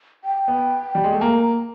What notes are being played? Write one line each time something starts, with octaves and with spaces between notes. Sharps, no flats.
G5
B3
G3
G#3
A3
A#3 A#5